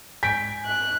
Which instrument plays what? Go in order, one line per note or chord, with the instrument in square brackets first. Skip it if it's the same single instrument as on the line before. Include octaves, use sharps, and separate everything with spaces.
[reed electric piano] G#2 G6 [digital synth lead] G#5 [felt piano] B6 D7
[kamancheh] F#6